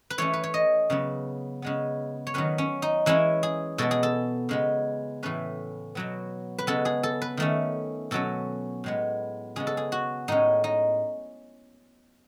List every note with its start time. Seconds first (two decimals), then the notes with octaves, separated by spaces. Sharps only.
0.10 B4
0.18 E3 A3 C#4 C#5
0.33 B4
0.43 C#5
0.54 D#5
0.90 C#3 F#3 B3
1.62 C#3 G#3 B3
2.27 C#5
2.34 D#3 F#3 C#4 B4
2.58 C#4
2.82 D#4
3.06 E3 G#3 C#4 E4
3.43 G#4
3.78 B2 G#3 B3 A4
3.91 G#4
4.03 A4
4.49 C#3 G#3 B3
5.23 A2 E3 A3 C#4 B4
5.95 B2 F#3 B3
6.58 B4
6.67 C#3 G#3 B3 A4
6.85 G#4
7.03 A4
7.22 B4
7.37 D#3 A3 C#4
8.11 B2 F#3 C#4 A4
8.84 A2 G#3 B3
9.56 C#3 G#3 B3 G#4
9.67 A4
9.77 G#4
9.92 F#4
10.28 A2 G#3 C#4 D#4
10.64 D#4